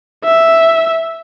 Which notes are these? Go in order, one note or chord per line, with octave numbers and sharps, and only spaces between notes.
E5